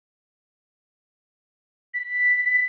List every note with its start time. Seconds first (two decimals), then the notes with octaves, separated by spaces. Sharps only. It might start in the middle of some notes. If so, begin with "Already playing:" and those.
1.94 B6